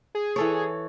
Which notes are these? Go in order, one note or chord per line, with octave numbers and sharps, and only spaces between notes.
G#4
E3 A4 C#5